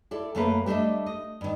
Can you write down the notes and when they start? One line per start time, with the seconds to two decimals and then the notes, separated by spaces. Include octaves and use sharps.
0.11 E4 A4 D5
0.35 F#2 A3 A#3 A4 B4
0.66 G3 A3 D4 D#5 E5
1.06 D#5
1.41 G2 D#3